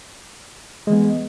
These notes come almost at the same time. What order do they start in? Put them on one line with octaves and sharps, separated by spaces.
G#3 E3 B3